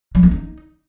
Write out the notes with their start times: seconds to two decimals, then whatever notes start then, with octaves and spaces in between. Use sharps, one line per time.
0.15 F3
0.23 A#3
0.31 D#4